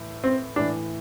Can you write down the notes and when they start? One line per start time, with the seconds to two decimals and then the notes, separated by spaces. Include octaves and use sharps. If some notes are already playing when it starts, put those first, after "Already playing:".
Already playing: A2 E3
0.24 C4
0.56 A2 E3 D4